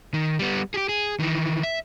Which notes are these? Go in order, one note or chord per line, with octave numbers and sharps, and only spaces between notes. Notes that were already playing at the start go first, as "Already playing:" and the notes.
D#3
G3 B3
G4 G#4
G#4
D#3 E3
E5